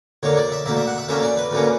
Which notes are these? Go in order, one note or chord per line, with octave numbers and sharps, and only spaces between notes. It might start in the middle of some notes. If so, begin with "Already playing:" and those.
D2 D3 A#3 C#5
D5
E5
D2 D3 A#3 E5
E5
F#5
E5
D2 D3 A#3 C#4 E5
D5
B4
D2 D3 A#3 C#4